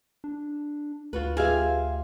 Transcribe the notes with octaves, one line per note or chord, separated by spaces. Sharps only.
D4
D2 F4 F#4 B4
F4 G4 G#4 E5 F5 G#5